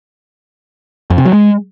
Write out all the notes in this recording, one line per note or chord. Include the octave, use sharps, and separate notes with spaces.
F2
C3
F#3
G#3